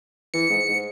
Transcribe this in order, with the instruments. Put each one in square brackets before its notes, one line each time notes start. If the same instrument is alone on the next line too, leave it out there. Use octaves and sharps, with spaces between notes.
[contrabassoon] E3 [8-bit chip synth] C#7
[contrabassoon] G#2
G#2